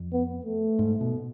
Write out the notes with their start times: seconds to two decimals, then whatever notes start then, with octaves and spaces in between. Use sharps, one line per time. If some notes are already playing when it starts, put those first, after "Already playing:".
Already playing: F2
0.12 B3
0.45 A3
0.79 G#2
1.01 B2